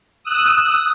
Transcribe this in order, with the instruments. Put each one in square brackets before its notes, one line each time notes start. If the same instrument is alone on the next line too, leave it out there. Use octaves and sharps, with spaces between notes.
[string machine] D#6 E6 F#6